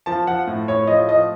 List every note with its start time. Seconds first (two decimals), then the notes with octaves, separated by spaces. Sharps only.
0.06 F3 A5
0.27 F3 F#5
0.47 A2
0.68 A2 C#5
0.87 F3 D#5
1.08 F3 D#5